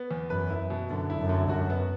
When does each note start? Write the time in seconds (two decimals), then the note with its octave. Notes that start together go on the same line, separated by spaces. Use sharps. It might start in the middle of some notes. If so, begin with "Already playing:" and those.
Already playing: B3
0.11 E2
0.30 F#2 B4
0.50 E4
0.70 B2
0.90 F#2 D3
1.10 E4
1.20 F#2
1.29 D3
1.49 F#2 F#4
1.70 B3